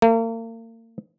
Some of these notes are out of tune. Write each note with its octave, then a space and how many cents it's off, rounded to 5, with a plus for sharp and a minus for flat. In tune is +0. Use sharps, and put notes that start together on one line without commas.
A#3 -40